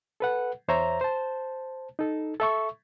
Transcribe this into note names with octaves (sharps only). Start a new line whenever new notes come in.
A4 B4 F#5
E2 C5 C#5 E5 A#5
C5 A5
D#4 A4
A4 E5 C#6